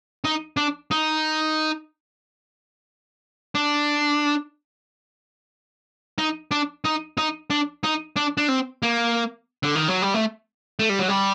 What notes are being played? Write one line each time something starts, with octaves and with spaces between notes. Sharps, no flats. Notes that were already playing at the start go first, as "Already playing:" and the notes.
D#4
D4
D#4
D4
D#4
D4
D#4
D#4
D4
D#4
D4
D4
C4
A#3
D3
D#3
F#3
G3
A3
A3
G3
F#3
G3